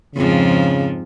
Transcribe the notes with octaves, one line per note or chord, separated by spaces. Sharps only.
F2 G#2 C#3 F3